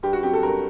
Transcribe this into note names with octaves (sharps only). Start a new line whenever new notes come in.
G2 G4
F#4
F#3 C4 G4
A4
G2 A#4